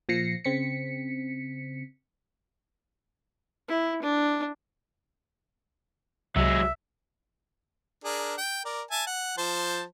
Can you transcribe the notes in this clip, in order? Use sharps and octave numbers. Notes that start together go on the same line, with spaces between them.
A#2 F3 A#6 C7 C#7
C#3 C4 B6 C#7
E4
D4
C2 F#3 G#3 E5
D4 G#4 A#4
G5
A#4 D5
E5 G#5 A5
F#5
F3 C5 A5